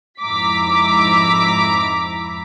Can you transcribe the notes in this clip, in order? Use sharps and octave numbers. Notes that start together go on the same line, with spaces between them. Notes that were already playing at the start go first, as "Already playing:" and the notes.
F2 G#2 E4 A#5 D6 B6